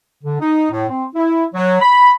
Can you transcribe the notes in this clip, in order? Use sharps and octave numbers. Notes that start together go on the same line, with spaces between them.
D3
D#4
A2
C4
E4
F#3
B5